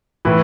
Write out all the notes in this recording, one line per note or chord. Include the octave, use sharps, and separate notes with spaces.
A2 E3 B4